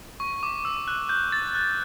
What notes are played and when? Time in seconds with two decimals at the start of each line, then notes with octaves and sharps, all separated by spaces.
0.20 C#6
0.43 D6
0.65 E6
0.88 F#6
1.09 G6
1.32 A6
1.55 F#6